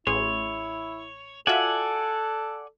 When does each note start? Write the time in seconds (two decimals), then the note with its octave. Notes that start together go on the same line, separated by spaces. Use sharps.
0.07 A1 E4 G#4 C#5 C6
1.47 F4 F#4 A4 D5 E5 F#5 G#5